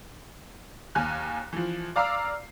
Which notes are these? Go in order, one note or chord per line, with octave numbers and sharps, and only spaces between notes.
D#2 G#5 F6 F#6
E3 F3
D5 F5 A#5 D6 E6 C7